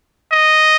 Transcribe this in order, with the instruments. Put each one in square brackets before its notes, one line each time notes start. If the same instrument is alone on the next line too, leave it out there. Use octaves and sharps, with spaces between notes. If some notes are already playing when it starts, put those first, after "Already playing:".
[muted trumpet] D#5